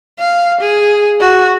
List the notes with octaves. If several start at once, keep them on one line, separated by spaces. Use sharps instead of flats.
F5
G#4
F#4